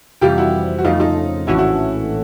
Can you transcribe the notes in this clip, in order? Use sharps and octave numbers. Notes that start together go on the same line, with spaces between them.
F2 C3 E3 G3 F4 G4
E4 F#4
F#4
F2 C#3 F3 A3 D#4 F4
D#4 F4
A#1 A2 E3 A3 C#4 E4 F#4
E4 F#4